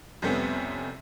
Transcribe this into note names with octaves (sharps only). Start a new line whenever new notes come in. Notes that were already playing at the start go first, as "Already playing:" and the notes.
F2 C3 G3 A3 B3 C#4